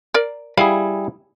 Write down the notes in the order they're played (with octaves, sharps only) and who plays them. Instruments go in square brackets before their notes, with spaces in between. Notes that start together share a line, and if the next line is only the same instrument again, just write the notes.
[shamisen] A#4 D5
[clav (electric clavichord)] G3 E4 G#4 [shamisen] F5 B5